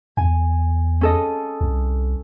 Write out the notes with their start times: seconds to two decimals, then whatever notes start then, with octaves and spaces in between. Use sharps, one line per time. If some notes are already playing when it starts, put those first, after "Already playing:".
0.17 E2 G#5
1.01 C#4 A4 D#5
1.61 C2